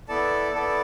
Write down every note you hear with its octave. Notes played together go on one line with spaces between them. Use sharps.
B3 E4 A4 D5 A5
B3 E4 A4 D5 A5